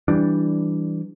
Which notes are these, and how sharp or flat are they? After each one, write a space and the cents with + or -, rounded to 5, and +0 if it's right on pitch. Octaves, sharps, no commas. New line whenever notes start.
E3 +0 G3 +0 D4 -5